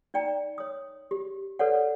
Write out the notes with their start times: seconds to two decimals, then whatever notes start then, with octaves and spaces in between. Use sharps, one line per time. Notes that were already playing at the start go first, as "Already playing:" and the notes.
0.14 D#4 D5 G5 A#5
0.58 C#5 D#6
1.11 G4
1.59 A4 B4 C#5 D5 F#5